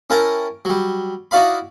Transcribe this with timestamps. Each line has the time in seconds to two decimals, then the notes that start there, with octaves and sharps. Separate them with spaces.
0.10 C#4 E4 A#4 G5 A5 A#5
0.65 F#3 G3
1.31 D#4 E4 F#4 D5 F5 B5